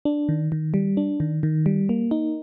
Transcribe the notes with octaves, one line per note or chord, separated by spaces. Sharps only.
D4
D#3
D#3
G3
D4
D#3
D#3
G3
A#3
D#4